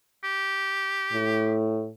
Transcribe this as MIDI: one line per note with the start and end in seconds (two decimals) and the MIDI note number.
0.24 1.58 67
1.13 1.90 45